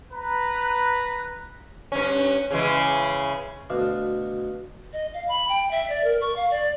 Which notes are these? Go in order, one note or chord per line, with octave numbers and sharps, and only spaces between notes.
B4 A#5
G2 C#4
C#3 E3 G#3
D2 B2 D4 F5
D#5
F5
B5
G5
E5
D5
A#4
C#6
F5
D5